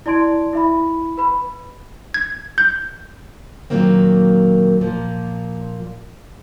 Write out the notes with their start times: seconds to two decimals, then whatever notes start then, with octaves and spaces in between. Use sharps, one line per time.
0.06 E4 D5 A5 C6 G#6 D7
0.53 E4 E5 B5
1.17 B4 B5
2.14 G#6
2.58 G6
3.70 A#2 D#3 F#3 A#3 C4
4.81 A#2 F3 A#3